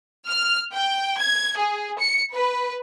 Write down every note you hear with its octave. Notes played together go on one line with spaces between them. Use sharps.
F6
G5
G#6
G#4
C#7
B4